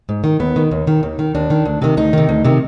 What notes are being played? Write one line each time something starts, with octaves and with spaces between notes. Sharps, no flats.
G#2
D#3
D#2 B3
D#3
D#2
D#3
D#2
D#3
D#2 D4
D#3
D2
C3 D#3
D2 D#4
C3 D#3
D2
C3 D#3